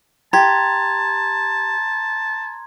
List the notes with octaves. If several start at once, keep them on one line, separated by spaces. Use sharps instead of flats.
G4 A5 A#5 C6 G#6